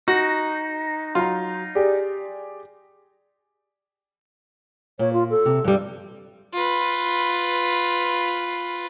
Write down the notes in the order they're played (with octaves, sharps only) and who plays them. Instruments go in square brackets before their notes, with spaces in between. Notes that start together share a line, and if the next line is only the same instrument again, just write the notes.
[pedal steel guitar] D#4 [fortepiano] F#4
[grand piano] F#3 A#5 [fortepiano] F4
[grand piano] G4 G#4 D5
[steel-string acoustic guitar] A#2 [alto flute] C#5
[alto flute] F4
A4
[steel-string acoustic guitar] C3
G2 G3
[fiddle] F4 B4